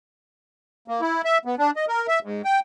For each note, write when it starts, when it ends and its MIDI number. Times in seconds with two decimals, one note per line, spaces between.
0.88 1.01 58
1.01 1.22 64
1.25 1.38 76
1.45 1.55 59
1.58 1.71 62
1.76 1.85 75
1.88 2.07 70
2.08 2.19 76
2.23 2.42 44
2.45 2.60 79